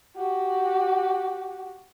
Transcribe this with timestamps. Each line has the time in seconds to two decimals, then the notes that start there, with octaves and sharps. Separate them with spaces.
0.17 F#4 G4